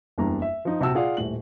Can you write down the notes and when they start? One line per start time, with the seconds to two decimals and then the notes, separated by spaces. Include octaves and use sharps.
0.18 F#1 E2 G3 D4 A#5
0.42 E5
0.65 F3 D#4
0.80 D#1 C3 F#4 A5 E6
0.95 F4 G#4 D5 F5 F#5
1.17 D#1 A2 F#7